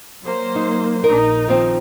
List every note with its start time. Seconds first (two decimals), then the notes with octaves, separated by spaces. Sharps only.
0.23 F#3 A#3 C5
0.55 D#4
1.04 A#1 D#4 A#4
1.48 D#3 F3 C4